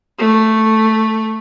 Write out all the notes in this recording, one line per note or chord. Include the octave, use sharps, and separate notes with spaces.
A3